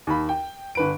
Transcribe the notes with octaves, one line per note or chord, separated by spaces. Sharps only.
D#2 B5
G5
G1 B4 D7